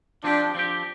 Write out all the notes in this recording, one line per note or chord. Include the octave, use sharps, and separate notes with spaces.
F3 C4 D4 G4
F3 C4 G4